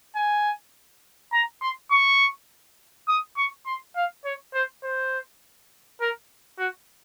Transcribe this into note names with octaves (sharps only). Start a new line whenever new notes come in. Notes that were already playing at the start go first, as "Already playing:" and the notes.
G#5
A#5
C6
C#6
D#6
C#6
C6
F5
C#5
C5
C5
A#4
F#4